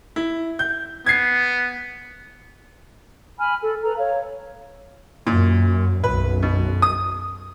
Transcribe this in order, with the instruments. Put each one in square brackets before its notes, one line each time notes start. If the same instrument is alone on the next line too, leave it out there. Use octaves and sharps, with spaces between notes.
[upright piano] E4
G6
[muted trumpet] B3 [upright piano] G#6 C7
[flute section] G#5 B5 F6
A4
A4 B4 A#5
C#5 F5
[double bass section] F#2 [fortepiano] A#2
[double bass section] B1 F#2 [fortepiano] B4
[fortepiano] B2
D#6